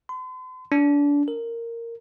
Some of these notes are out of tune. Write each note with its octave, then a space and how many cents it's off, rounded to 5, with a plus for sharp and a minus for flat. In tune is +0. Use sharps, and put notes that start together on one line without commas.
C6 -45
D4 -30
A#4 -10